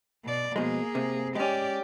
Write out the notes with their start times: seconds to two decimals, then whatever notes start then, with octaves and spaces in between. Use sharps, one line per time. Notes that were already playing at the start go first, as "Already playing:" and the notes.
0.24 B2 D5
0.56 B2 F3 G#3 A#3 G#4
0.95 C3
1.35 G#3 C#4 G4 D5